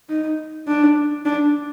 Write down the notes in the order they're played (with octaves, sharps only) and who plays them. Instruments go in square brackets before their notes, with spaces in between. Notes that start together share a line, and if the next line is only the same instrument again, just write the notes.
[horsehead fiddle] D#4
D4
D4